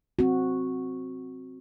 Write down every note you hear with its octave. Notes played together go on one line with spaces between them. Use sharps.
C4 F#4